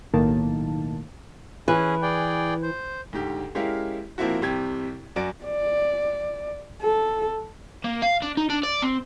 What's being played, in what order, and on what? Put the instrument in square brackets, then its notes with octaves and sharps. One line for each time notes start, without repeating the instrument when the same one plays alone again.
[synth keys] B1 A2 D#3 A#3 A5
[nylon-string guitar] E3 B4 [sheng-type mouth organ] C#4 G#4
[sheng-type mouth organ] G#4 D5 G5
C5
[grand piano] D2 G#2 G4
G#3 C#4 E4 G4 A#4 F5
F3 A#3 C4 E4 F#4
C2 C3 G4 G#6
F#2 F#4 D5 G#5 D7
[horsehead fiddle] D5
A4
[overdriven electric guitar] A#3
F5
D4
D#4
D4
D5
C4